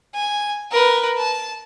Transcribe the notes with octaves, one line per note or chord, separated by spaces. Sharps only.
G#5
A#4 B4
A5